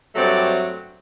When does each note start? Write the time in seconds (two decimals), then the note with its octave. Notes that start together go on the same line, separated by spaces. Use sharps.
0.15 G2 F#3 A3 C4 D5